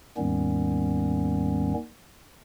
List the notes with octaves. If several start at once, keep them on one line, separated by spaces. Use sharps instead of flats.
D#2 G#2 D#3 G3 B3 C#4